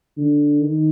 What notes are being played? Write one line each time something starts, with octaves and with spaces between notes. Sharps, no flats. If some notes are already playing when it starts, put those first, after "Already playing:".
D3
D#3